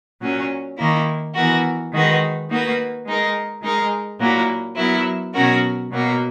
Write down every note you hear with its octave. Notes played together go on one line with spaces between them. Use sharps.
A#2 F#3 C#4
D#3 A#3 E4
E3 B3 F#4 A#4
D#3 G#3 D#4 F#4 B4
A#3 D#4 F#4 B4
G#3 D#4 A#4
G#3 D#4 A#4
A#2 F#3 A#3 E4
F#3 B3 E4 A#4
B2 F#3 C#4 F#4 A#4
B2 F#3 A#3